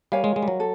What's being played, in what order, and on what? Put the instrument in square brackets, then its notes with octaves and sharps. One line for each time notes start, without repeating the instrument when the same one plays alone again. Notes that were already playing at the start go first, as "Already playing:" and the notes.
[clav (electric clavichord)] G3 [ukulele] A#4 C#5 F5 G#5
[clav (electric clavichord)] G#3
G#3
G3
F#3
[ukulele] A4